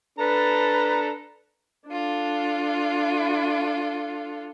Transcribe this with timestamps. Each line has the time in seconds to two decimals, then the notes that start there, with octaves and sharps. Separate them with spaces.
0.19 D4 A4 B4 A#5
1.89 D4 F4 A4